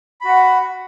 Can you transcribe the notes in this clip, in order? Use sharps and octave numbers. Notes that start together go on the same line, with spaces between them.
F#4 F#5 B5